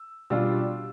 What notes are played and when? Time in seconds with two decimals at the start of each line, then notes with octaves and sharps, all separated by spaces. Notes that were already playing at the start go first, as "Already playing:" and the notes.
Already playing: E6
0.30 B2 G3 D4 F4 E6